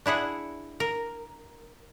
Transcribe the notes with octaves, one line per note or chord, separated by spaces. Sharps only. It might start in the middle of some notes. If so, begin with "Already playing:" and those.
D4 E4 G#4 F#5
A#4